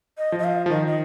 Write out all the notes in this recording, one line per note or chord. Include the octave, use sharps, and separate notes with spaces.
D#5
F3
D#5
F5
F3
D#3 D#5
D#5